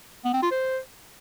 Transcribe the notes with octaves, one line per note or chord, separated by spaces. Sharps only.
B3
C4
F4
C5